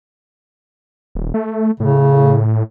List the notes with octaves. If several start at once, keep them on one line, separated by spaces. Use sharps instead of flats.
D#1
A3
A2 C#3